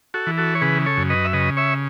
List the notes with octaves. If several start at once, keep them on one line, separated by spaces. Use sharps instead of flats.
F#4 A4
E3
F#4 A4
C#5
C#3 G#4 B4
A4 C#5
F#2
B4 D#5
E5
C#3 B4 D#5
C#5 E5